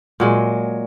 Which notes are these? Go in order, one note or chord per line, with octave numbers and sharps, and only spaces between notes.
A#2 F#3 G#3